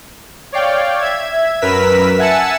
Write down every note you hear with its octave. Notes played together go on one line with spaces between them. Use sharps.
C#5 D5 F5 G5
E5 G#6
F#2 A#4 B4 E6 B6
E5 F#5 G#5 A5 E6 C#7